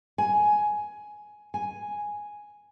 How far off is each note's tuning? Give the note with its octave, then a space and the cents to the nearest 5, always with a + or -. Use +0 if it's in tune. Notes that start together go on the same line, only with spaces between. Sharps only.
G#5 +10
G#5 +0